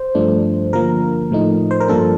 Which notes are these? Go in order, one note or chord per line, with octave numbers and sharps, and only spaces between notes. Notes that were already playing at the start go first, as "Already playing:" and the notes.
Already playing: C5
G2 F3 A3 D4
D3 F3 A#3 A#4
A2 F3 A3 D#4
C5
A#4
G2 F3 A#3 D4 A4